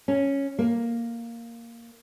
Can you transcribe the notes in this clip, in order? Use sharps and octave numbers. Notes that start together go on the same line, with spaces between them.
C#4
A#3